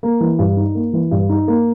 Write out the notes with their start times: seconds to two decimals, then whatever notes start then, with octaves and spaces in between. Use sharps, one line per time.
0.03 A#3
0.20 E3
0.39 G2
0.57 D#4
0.75 A#3
0.93 E3
1.11 G2
1.29 D#4
1.48 A#3